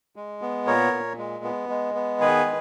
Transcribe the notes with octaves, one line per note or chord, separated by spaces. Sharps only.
G#3
B3
A#2 A#4 C#5
A#2
G#3
B3
G#3
B3
D#3 G#4 B4
G#3